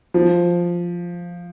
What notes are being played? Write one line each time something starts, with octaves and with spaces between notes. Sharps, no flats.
F3